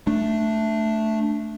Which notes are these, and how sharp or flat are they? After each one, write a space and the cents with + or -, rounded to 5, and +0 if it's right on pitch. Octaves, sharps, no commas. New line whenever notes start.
A3 +0 D4 +0